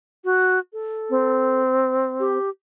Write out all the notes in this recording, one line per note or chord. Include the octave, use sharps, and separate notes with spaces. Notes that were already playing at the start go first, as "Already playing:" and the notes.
F#4
A4
C4
G4